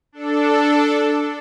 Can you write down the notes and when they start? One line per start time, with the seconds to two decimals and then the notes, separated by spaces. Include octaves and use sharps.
0.12 D4 A4